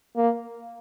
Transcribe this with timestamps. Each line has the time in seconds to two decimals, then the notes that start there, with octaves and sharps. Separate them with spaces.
0.16 A#3